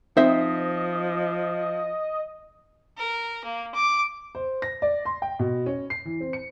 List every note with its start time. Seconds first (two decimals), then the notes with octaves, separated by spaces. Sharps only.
0.17 F3 C4 D#4 C5 D#5 E5
2.98 A#4
3.45 A#3
3.75 D6
4.35 C5
4.62 A#6
4.82 D5
5.05 C6
5.22 G5
5.39 B2
5.66 C#4
5.90 C7
6.05 E3
6.20 C4
6.33 C#7